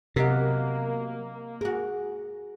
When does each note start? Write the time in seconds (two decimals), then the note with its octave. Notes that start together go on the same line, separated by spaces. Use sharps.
0.16 C3 F#3 A#3 B3 G4 A#4 D#5
1.61 F#4 G#4 A#4